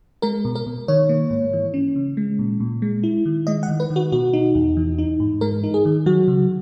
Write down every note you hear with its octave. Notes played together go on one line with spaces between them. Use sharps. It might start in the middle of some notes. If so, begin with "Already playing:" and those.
G#3 A#4
B2
A#4
B2
D#3 C#5
A#3
G#2
E3
C#4
C#3
G#3
A#2
A#2
G#3
E4
D#3
G#3 D#5
F#5
D#3
B4
D#3
F#4
B2 F#4
D#4
E2
E3
D#4
G#2
G#3 A#4
D#4
G#4
D#3
F#3 F#4
C#3